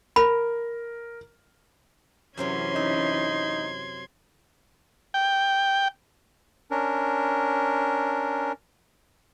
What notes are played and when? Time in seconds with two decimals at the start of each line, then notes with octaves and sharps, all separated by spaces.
0.16 A#4 B5
2.37 F#2 C3 E3 F#3 C#4 C6 G#6
2.76 D#4 E5
5.14 G5
6.71 C#4 D4 A#4